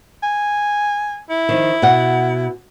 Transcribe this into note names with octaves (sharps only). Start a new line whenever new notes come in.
G#5
E4
D#3 F3 D#4
B2 F#5